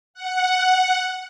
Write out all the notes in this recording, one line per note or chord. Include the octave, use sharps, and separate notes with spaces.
F#5